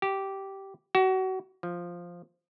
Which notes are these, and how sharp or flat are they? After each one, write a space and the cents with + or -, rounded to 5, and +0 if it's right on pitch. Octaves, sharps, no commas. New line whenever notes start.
G4 -10
F#4 +30
F3 +0